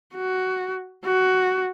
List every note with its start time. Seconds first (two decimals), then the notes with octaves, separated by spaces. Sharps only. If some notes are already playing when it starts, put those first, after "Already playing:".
0.15 F#4
1.05 F#4